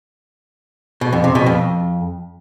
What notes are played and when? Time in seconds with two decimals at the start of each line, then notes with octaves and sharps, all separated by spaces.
1.01 B2
1.13 F2
1.24 C3
1.35 B2
1.46 F2